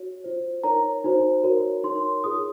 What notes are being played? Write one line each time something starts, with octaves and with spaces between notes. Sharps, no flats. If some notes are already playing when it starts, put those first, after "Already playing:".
Already playing: F#4 C#5
F4 C5
D#4 A#4 C#5 A#5
D#4 F#4 C5
F#4 A#4 C#5
D#4 A#4 C#5 C6
F4 G#4 C#5 D#6